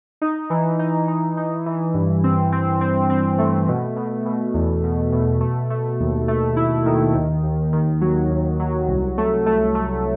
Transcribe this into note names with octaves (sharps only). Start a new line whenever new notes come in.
D#4
E3
D#4
D#4
D#4
E3
G2
C4
C4
C4
C4
A3
B2
B2
B2
E2
B2
B2
A3
A3
D#2
A3
E4
D#3
D#2
D#2
D#3
F#3
D#2
F#3
C2
A3
A3
A3